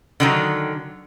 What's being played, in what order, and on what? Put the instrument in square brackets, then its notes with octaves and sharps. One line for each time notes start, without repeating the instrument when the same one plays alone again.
[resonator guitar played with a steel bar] D3 D#3 F#3